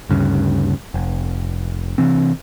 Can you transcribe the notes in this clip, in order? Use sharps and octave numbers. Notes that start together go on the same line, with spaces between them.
D2 G2 C#3
F1
C3 E3 C4